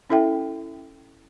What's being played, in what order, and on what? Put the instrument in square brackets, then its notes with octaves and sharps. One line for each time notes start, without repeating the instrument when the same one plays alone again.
[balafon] C#4 E4 A4 E5 G5